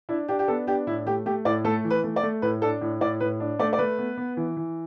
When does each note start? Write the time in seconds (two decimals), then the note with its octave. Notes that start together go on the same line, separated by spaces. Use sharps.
0.09 D4 E4
0.28 D4 G4
0.39 G4
0.48 B3 A4
0.67 D4 G4
0.87 A2 E4
1.06 A3 G4
1.26 A3 G4
1.45 A2 D5
1.64 A3 A4
1.84 E3
1.90 B4
2.04 A3
2.16 D5
2.23 A3
2.42 A2 B4
2.62 D4 A4
2.81 A2
3.01 A2 D5
3.20 A2 B4
3.40 D4
3.59 A3 D5
3.73 D5
3.78 A3 B4
3.98 B3
4.17 B3
4.37 E3
4.57 E3